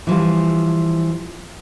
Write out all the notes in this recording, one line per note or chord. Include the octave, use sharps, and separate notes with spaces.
E3 F3 G3